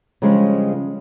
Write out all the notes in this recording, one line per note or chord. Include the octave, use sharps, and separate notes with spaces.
C#3 F3 G3 G#3 C#4 D4